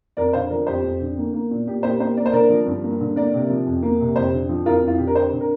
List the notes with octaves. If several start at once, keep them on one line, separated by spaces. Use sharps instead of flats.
F2 A#4 D5
D3 C5 F5
F3 A#4 D5
F2 G4 C5
F2
D3
A#3
A#3
A#2
A#2 G4
A#3 G4 C5
A#3 G4 C5
A#3 D5
C5
D3 A#4 D5
F3
G2
A#3
D3
A#3 A#4 D5
C3
F3
F2
A#3
C3
F2 G4 C5
D3
F3
F2 F4 A#4
F2 F4
D3 G4
A#4
C4 G4 C5
D3
A#4